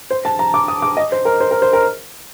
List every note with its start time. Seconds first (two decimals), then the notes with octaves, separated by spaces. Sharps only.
0.11 C5
0.25 A5
0.39 A#5
0.54 D6
0.68 D#6
0.82 D6
0.97 D#5
1.12 C5
1.25 A#4
1.40 C5
1.51 A#4
1.62 C5
1.73 A#4